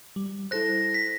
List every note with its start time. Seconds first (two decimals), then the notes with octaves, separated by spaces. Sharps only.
0.16 G3
0.51 E4 A4 C5 F#6 A#6
0.94 B6